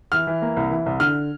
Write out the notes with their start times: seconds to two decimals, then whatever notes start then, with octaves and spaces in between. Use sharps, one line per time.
0.12 E3 F6
0.27 E3
0.42 A#3
0.56 C2
0.71 E3
0.86 C2
1.00 D3 F6